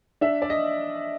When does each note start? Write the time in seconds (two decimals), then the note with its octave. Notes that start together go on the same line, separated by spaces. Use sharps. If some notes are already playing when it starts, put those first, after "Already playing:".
0.21 D4 E5
0.42 D5
0.50 D#5